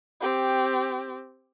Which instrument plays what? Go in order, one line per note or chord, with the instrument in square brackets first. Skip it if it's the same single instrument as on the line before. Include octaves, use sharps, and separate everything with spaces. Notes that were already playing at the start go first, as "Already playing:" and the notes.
[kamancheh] C4 G4